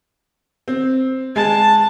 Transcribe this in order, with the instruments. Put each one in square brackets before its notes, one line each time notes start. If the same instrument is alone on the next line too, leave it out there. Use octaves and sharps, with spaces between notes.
[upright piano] C4
[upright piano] G#3 [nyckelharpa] A5